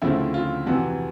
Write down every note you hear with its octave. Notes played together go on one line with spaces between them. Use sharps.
D2 C#3 F3 A3 C4 E4
F4
F2 C3 E3 F#4